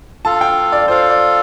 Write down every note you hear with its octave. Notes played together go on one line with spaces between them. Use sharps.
F4 A4 F5 A5
G5
D5
F4 A4 C5 F5
D5